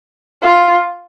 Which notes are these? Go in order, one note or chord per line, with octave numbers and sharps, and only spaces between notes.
F4